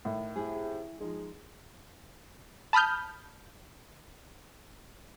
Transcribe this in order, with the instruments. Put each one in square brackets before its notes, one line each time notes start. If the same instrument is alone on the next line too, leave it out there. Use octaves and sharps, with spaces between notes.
[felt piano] A2 [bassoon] D#3
[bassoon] C3 [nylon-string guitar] E4 G#4
[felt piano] F3 D#4 [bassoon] G#3
[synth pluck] A5 B5 D#6 F6 G6